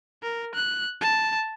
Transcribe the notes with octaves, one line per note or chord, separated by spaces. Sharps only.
A#4
F#6
A5